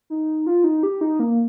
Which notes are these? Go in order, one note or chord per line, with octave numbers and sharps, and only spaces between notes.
D#4
F4
D#4
G4
D#4
A#3